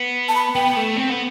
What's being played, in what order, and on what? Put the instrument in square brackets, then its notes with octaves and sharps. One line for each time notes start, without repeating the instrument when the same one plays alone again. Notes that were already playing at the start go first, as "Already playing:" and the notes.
Already playing: [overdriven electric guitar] B3
[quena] A5
B5
[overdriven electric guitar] B3 [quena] G5
[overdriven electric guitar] A3
C4
B3